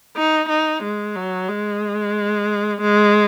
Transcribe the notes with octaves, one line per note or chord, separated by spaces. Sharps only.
D#4
D#4
G#3
F#3
G#3
G#3